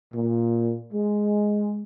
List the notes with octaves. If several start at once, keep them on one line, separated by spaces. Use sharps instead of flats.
A#2
G#3